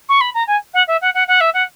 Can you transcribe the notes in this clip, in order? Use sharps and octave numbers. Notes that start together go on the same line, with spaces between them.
C#6
B5
A#5
G#5
F#5
E5
F#5
F#5
F#5
E5
F#5